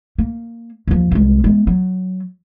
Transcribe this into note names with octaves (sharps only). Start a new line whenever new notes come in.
A#3
D#2 F3
C2 G#3
G#3 B3
F#3